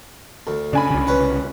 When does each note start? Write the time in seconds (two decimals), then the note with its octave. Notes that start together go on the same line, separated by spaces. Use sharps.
0.47 D2
0.73 C#3 D4 G#5 B5
0.91 C2 C#3
1.07 C#4 B4 F#5